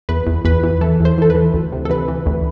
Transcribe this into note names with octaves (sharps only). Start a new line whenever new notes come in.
E2 B4
E2
E2 B4
E3
E3 A4
E2
C5
E3 A4
B4
E3
D2
C3
A4
E3 B4
E3
D2